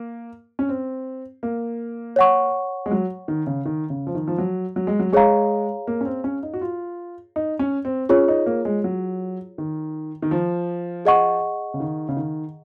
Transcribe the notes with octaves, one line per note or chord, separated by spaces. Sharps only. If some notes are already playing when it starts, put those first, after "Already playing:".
Already playing: A#3
C#4
C4
A#3
C#5 F#5 C#6
G#3
F#3
D#3
C#3
D#3
C#3
F3
D#3
F3
F#3
F#3
G#3
F#3
G#3 G#4 C#5 F5 A#5
A#3
C#4
C4
C#4
D#4
F#4
F4
D#4
C#4
C4
C#4 F4 G#4 C#5
D#4
A#3
G#3
F#3
D#3
D#3
F3
G#4 D#5 F#5 C#6
C#3
D#3
C#3
D#3